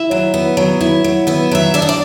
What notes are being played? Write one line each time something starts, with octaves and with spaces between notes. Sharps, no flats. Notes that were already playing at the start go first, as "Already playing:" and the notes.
Already playing: E4 E5
F#3
B3
F#3
E4
F#3
B3 E5
F#3 E5
D4 E5
D#5
D5